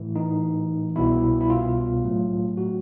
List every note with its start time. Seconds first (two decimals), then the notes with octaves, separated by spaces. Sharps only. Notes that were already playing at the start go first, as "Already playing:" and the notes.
Already playing: A2 E3 A3
0.16 D#4
0.96 C2 B2 G3 B3 E4
1.41 E4
1.50 F4
2.03 A2 F#3 A3
2.57 F#4